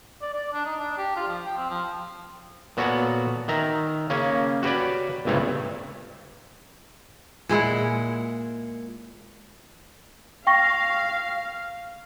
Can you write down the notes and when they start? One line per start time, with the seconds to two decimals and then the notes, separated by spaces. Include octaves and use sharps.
0.22 D5
0.33 D5
0.53 D4
0.65 D#4
0.80 D4
0.98 G4
1.16 F4
1.28 F3
1.46 G5
1.58 C4
1.70 F3
2.77 A#2 B3 F#4 A4 C#5 F#5
3.48 D#3 E5 A#5
4.10 C#3 A#3 C#4
4.63 F#4 G4 B4 C#5 D5
5.25 G1 C#2 G2 C3 A3 C#5
7.49 A#2 G#3 E4 F#5
10.47 F5 G5 C#6 A#6